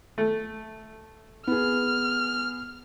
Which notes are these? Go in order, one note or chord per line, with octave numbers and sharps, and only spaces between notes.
A3
B3 G#4 F6